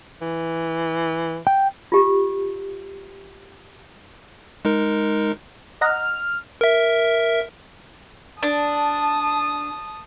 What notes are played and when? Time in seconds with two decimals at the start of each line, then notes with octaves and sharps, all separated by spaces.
0.22 E3
1.47 G5
1.92 F4 G4
4.65 G#3 D#4 A#4
5.81 D#5 F#5 A#5 F6
6.61 A#4 E5
8.43 D4 A5 D#6